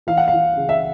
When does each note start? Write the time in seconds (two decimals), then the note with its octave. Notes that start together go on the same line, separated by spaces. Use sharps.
0.07 E3 F5
0.17 F#5
0.28 E3 F5
0.57 C#3
0.69 E5